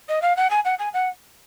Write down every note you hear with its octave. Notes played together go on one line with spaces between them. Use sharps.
D#5
F5
F#5
G#5
F#5
G#5
F#5